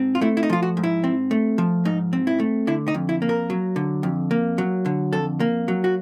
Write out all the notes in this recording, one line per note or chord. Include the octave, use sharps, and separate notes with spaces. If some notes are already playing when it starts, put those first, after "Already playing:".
Already playing: G#2 C4
F4
A3 E4
E4
D#4
F3 F4
F#4
G#2
E4
C4
A3
F3
G#2 D#4
C4
E4
A3
D3 E4
D#4
F2
E4
A#3
A#4
F#3
D3
F2
A#3
F#3
D3
F2 A4
A#3
F#3
F#4